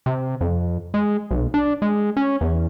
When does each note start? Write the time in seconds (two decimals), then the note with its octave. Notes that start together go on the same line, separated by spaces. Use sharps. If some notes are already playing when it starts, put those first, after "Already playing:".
0.06 C3
0.41 F2
0.94 G#3
1.31 B1
1.54 D4
1.82 G#3
2.17 C#4
2.41 E2